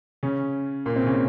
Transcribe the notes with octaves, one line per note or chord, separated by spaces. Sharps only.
C#3 C#4
A#2 A#3
C3 C4
C#3 C#4